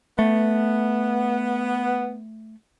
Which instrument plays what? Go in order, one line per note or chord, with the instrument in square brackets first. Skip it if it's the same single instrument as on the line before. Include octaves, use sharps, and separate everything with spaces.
[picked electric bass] A3 [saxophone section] B3